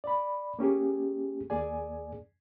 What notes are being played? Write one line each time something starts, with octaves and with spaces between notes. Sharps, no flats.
D5 B5
A#3 C#4 G4 G#4
D#2 A#3 G#4 D5 G#5